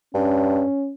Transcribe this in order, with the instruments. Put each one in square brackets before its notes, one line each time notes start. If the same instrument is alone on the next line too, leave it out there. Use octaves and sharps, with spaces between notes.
[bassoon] G2 [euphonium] C#4